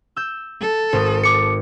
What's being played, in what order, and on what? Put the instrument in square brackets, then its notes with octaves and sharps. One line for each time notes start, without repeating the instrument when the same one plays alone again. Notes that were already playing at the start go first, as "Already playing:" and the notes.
[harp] E6 G6
[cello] A4
[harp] G#1 D#6
[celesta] D6 C#7